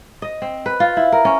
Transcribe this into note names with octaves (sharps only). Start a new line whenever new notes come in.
D#5
C4
B4
F4
E4
A#4
C#4